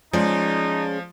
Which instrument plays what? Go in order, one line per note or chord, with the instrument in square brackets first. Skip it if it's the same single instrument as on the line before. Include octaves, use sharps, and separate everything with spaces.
[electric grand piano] F3 [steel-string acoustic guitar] G#3 C#4 D5 [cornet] D#4